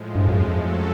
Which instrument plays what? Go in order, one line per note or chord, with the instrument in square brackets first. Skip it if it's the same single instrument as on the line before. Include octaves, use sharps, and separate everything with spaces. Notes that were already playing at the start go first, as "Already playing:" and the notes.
Already playing: [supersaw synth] A2 F3 G#3
[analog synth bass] G2
F#2
F2
[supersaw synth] F#3 A3 C#4 F#4 A4